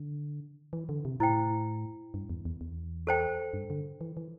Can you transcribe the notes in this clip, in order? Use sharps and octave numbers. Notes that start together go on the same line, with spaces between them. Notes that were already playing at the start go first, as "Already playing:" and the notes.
Already playing: D3
E3
D3
C3
A2 E4 C5 G5
G2
E2
E2
E2
A4 C5 G5
G2
D3
E3
E3